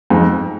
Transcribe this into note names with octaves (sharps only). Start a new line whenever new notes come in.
F2 G#2